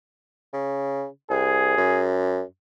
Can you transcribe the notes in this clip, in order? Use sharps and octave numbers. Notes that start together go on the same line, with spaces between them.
C#3
C2 G#4
F#2